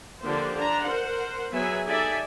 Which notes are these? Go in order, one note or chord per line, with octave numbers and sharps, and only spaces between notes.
D3 F3 A#3 G4 C5
D3 D4 A#5
A#4 C5 F#5
F#3 B3 G#4 E5 G#5
D#4 G4 A4 D5 E5 G#5